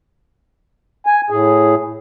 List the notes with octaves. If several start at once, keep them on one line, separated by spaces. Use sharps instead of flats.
G#5
A2 G#4